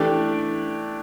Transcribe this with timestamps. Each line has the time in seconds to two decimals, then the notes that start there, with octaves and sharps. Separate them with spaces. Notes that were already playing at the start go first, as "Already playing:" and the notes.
Already playing: E3 A3 D4 G4 D5